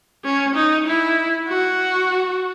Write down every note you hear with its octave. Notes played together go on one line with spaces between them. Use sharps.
C#4
D#4
E4
F#4